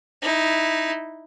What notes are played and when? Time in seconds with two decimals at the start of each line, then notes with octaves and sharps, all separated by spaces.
0.22 D#4 E4